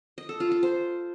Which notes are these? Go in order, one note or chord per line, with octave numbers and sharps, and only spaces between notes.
D#5
A4
F4
F4
C5